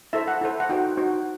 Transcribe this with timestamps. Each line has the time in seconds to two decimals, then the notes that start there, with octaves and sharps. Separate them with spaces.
0.13 E4 A4 C5 E5
0.28 F#5
0.41 E4 A4 C5
0.60 F#5
0.69 D#4 F#4 C5 G5
0.97 D#4 F#4 C5